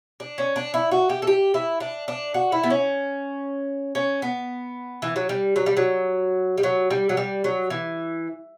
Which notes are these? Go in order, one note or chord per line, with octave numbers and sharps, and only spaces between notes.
D4
C#4
D4
E4
F#4
G4
A4
G4
E4
D4
D4
F#4
E4
B3
C#4
C#4
B3
E3
F#3
G3
F#3
G3
F#3
G3
F#3
G3
F#3
G3
F#3
E3